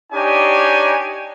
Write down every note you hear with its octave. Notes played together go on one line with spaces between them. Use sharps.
D4 D#4 G4 C#5 G#5